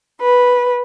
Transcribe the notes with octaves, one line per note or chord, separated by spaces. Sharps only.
B4